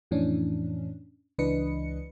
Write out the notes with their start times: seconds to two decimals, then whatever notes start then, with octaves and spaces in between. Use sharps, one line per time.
0.11 F2 A2 E3 C#4 D4
1.38 C#2 E3 D4 B4 D#5 C#7